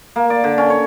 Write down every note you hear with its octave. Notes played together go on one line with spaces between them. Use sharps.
A#3
D5
D3
C#4
C#5